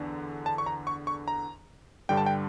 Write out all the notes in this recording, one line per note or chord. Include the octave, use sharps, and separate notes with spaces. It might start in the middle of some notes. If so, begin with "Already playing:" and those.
Already playing: E2 D3
A5
C#6
A#5
C#6
C#6
A#5
G2 D3 G3 G5
A5
G5